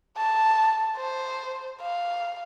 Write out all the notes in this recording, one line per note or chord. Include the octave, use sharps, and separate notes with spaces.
A5
C5
F5